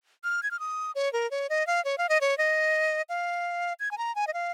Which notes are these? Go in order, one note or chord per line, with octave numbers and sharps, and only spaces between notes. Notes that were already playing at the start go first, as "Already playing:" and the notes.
F6
G#6
F6
D#6
C#5
A#4
C#5
D#5
F5
C#5
F5
D#5
C#5
D#5
F5
G#6
G#5
A#5
G#5
D#5
F5